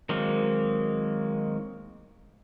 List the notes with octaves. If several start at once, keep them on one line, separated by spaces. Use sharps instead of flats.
D#3 F#3 G#3 A#3 C4